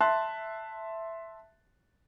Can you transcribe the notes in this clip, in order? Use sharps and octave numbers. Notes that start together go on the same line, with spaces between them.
E5 A5 C6 F#6